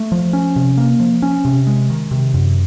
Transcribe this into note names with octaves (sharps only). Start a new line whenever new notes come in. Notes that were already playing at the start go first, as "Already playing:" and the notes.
Already playing: A3
F3
C#4
C3
A#3
F3
C#4
C3
G#3
D#3
C3
F#2